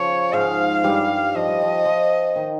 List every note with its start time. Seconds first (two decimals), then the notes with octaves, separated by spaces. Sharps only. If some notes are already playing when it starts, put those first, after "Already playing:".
Already playing: C#3 F3 C#5
0.33 G#2 G#3 F5
0.84 G2 G3
1.35 F3 D#5
1.48 G3
1.63 F3
1.85 F3
2.36 D#3